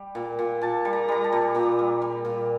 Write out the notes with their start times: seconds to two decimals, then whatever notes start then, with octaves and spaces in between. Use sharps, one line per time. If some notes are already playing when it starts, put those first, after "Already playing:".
Already playing: G3
0.15 A#2
0.39 A#2
0.61 A#2 A5
0.85 G3
0.93 A#5
1.08 G3 A#5
1.24 A5
1.32 A#2
1.55 A#2 A#5
1.79 G3
2.02 G3
2.25 A#2